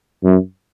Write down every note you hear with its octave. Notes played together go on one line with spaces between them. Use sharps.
F#2